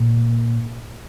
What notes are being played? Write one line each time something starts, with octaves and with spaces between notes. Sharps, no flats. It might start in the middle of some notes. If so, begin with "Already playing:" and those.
Already playing: A#2